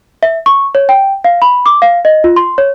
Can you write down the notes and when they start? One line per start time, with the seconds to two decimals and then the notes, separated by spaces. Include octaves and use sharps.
0.23 E5
0.46 C#6
0.75 C#5
0.89 G5
1.24 F5
1.42 B5
1.66 D6
1.82 F5
2.05 D#5
2.24 F4
2.36 C6
2.58 C#5